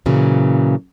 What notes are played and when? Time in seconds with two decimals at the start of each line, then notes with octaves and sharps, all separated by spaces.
0.06 A#2 C#3 E3 F#3